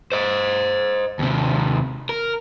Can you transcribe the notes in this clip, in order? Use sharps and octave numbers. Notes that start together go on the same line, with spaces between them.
C5 D#5
D#2 C3
A#4